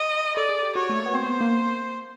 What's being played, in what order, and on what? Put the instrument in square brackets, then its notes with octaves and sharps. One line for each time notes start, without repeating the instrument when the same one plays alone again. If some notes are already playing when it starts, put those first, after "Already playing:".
Already playing: [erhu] D#5
[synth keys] A4 [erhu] D5
[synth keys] G#4
G4
[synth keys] F#4 [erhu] C#5
[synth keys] A3
A#3
B3
[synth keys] C4 [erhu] C5
[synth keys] B3
A#3